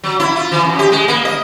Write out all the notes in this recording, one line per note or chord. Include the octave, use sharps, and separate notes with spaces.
F#3
E4
F4
E3
F#2
G4
G#3
A#3
D#5